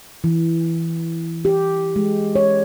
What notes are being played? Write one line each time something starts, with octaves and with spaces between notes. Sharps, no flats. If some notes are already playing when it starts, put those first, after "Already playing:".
E3
G4
G#3
C#5